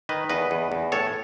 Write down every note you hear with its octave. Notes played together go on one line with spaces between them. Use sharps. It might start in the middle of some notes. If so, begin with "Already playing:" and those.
D#3 B4 D#5
E2 B4 D#5
E2
E2
A2 A4 C#5